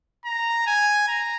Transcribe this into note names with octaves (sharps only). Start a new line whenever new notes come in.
A#5
G#5
A#5